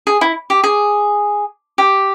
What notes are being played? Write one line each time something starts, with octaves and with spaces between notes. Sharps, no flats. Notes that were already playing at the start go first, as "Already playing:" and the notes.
G#4
E4
G4
G#4
G4